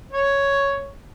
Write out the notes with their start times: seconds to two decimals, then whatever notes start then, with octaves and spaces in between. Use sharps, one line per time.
0.12 C#5